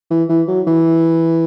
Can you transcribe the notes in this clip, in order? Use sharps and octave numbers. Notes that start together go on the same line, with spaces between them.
E3
E3
F#3
E3